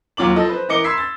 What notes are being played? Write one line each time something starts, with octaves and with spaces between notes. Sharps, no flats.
D#2 F#3 F4 D6 F#7
F3 A4 D#5
B4 C5
E3 A#4 D#5 D6 C#7 G7
B5 C6 E6 G#6 B6 C7
A6